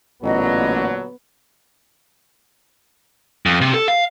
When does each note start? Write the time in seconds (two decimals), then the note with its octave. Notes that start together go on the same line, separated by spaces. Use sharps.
0.23 A1 A#2 D3 F#3 B3 D#5
3.46 F2
3.61 C3
3.74 A4
3.88 F5